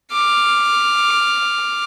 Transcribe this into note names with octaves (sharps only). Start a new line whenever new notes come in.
D6 F6